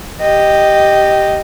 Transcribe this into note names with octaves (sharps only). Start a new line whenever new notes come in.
G4 D#5